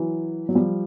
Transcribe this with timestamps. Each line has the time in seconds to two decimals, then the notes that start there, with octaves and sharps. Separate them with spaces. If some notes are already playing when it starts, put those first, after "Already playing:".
Already playing: E3 F#3
0.49 F#3
0.55 F3 G3